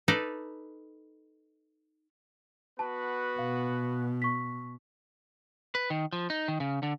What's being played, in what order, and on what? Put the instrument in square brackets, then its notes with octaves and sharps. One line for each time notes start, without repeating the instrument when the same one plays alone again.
[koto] D#4 A4 B4 D5 D#5
[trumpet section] B3 F#4 B4 [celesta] A5
[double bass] B2 [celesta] F5
[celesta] C#6 B6
[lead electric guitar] B4
D#3
F3
D#4
D#3
C#3
D3